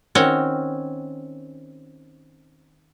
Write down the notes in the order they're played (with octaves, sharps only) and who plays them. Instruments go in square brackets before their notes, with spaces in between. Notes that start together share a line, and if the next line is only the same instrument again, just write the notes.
[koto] D#3 C4 C#4 F#4